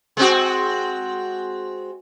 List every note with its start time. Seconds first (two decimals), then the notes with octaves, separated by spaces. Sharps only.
0.17 G#3 C4 F#4